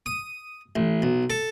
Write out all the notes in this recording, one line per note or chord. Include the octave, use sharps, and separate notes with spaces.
D#6
A1
B1
A4